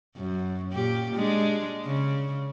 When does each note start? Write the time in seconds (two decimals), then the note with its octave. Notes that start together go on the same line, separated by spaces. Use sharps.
0.16 F#2
0.72 A#2 G4
1.15 G#3 D4
1.86 C#3